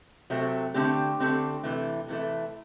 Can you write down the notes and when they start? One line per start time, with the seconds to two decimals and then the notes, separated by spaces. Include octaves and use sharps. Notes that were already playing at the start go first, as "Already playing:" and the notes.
0.30 C3 F#3 A3 C4
0.74 D3 A3 C4 G4
1.20 D3 A3 C4 G4
1.64 C3 E3 A3
2.08 C3 E3 A3